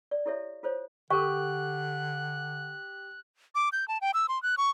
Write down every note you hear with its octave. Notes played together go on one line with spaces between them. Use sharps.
D5
E4 G4 A4 C#5 E5
F4 A4 C5 C#5
D3 G4 A4 A#4 C#6 F#6
D6
G6
A5
G5
E6
C6
F#6
C#6